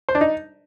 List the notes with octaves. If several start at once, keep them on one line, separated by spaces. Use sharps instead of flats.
C5
D4
D#4